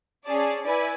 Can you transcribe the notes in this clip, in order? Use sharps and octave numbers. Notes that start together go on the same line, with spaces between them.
C#4 G#4 D5 A5
E4 B4 D5 G#5